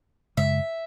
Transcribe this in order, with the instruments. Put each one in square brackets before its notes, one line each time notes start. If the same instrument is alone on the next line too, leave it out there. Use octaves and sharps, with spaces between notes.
[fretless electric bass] F#2 C#3 G#3 [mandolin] E5